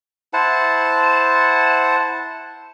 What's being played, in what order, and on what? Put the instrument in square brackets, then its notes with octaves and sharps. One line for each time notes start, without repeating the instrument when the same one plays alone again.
[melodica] E4 C5 F#5 A5